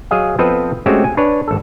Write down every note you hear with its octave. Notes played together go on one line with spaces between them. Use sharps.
F#3 G#4 D#5 F5
F3 B3 C4 A4 B4 D#5
G#3 A3 C4 C#4 F#4 G4
G#5
D4 B4 C#5
G#1 A4